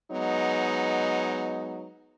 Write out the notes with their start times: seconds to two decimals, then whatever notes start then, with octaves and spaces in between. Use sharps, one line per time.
0.11 F#3 G#3 B3 D#4